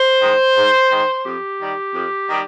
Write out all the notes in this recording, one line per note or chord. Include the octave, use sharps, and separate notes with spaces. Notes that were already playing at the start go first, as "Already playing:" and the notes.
Already playing: C5
D#3 G#3
G#2
D#3 G#3
F2 G4
D#3 G3
F2
D#3 G3